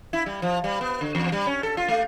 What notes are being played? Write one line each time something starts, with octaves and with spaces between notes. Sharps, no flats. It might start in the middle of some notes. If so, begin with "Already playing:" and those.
E4
G3
F3
G3
B3
D3
E2
G3
C#4
A4
F4
A3